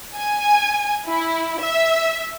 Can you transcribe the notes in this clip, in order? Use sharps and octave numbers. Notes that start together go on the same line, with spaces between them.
G#5
E4
E5